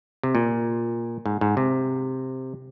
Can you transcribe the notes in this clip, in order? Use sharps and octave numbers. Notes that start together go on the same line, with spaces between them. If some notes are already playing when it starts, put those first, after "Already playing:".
C3
A#2
G#2
G#2
C3